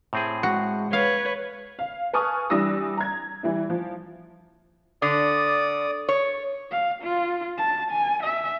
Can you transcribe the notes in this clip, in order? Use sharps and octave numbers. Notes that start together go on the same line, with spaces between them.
A2 C4 G#4
G#3 F#4
B4 C#5 F5
F5
B4 G#5 A5 C#6 D#6 F6
E3 G3 D4 D#6 E6 A#6
A#5 G#6
E3 G3 E4
F3
D3 D5 D#6
C#5
F5
F4
A5
G#5
E5